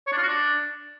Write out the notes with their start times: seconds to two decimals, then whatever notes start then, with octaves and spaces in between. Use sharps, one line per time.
0.07 C#5
0.12 D4
0.17 F4
0.23 F#4
0.28 D4